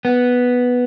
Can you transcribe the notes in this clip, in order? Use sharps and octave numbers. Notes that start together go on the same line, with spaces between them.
B3